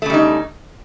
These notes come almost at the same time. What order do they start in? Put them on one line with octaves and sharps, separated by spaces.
A3 C#3 G3 D#4